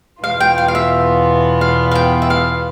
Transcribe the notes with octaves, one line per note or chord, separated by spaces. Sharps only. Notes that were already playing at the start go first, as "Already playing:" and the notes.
E2 B2 B3 F4 F5
G5
F5
F5
E5
F5
F5
G5
E5
F5